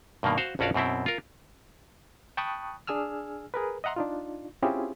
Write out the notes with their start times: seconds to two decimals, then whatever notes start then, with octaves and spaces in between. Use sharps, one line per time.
0.23 G2 B2 D#3 A#3
0.38 F#4 C5 F5
0.59 A#1 F2 C#4 F#4 D5 F5
0.74 F#2 B2 C4 E4
1.06 F4 A#4
2.37 G5 A5 B5 C#6 D#6 F#6
2.87 D4 G#4 G#5 E6 F6
3.54 G#4 A#4 B4
3.84 D#5 E5 F#5 A#5 C6
3.96 D4 D#4 F4
4.62 C4 C#4 E4 F4 G4 G#4